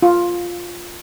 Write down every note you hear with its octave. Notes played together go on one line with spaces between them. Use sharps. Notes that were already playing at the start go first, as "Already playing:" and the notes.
F4